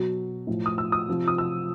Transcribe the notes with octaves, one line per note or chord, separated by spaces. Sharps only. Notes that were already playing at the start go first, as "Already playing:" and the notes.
Already playing: B2 F#3
A2 F3
D#6
E6
D#6
C3 F3
D#6
E6